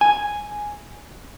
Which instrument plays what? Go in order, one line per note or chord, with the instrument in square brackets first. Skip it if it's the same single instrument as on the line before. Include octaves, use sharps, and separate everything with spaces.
[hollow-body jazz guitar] G#5